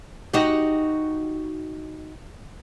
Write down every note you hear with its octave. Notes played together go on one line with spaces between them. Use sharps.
D#4 F#4 G4